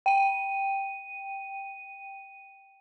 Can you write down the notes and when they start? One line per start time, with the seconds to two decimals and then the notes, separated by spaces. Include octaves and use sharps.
0.06 G5 D#7